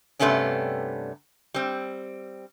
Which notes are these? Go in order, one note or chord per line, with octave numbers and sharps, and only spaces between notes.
G2 C3 A3 B3 C#4 D4
G3 C4